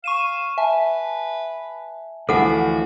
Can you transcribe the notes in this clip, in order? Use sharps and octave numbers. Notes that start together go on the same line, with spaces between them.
F5 C#6 D#7 E7
B4 E5 G#5 A5
D2 E3 F3 F#4 A4 F#5